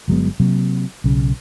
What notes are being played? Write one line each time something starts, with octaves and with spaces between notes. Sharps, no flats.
G1 F#3 G#3 B3
C3 F#3 A#3
B1 C#3